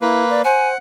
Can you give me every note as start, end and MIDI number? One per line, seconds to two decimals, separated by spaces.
0.02 0.42 58
0.02 0.24 64
0.02 0.42 71
0.30 0.42 74
0.45 0.74 72
0.45 0.78 78
0.45 0.68 80